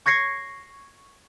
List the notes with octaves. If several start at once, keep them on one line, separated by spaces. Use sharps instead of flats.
C#6 G#6 A#6 C7 C#7